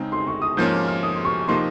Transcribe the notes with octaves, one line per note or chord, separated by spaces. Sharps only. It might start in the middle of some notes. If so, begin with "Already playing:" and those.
Already playing: C#3 G#3 C4 D#4
C6
C#6
D#6
G#2 F3 A#3 C#4 G6
F6
F6
D#6
C6
C#6
C3 F3 A#3 D#4 C6